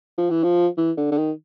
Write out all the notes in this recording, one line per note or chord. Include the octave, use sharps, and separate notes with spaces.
F3
E3
F3
E3
D3
D3
D#3